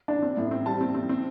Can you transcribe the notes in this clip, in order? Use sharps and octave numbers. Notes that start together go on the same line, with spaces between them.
D4
C4
A2
C4
G3 A5
C4
C4
C4